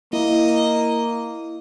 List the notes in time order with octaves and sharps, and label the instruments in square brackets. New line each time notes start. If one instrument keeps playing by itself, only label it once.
[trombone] A#3 [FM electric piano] E4 [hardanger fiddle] D#5